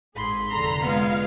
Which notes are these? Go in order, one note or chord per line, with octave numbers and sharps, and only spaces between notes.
G#1 G#2 G#4 B5 C6
F1 D3 A4 A#5
G#3 B3 F4 F5